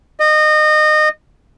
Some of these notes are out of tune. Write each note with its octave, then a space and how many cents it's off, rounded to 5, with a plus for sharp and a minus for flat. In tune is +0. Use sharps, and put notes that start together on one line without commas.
D#5 -25